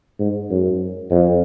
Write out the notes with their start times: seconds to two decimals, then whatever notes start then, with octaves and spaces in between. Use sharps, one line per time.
0.20 G#2
0.50 F#2
1.11 F2